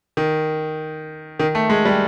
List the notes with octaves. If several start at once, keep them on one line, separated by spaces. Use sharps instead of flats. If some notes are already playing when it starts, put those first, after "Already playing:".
D#3
D#3
A3
G#3
G3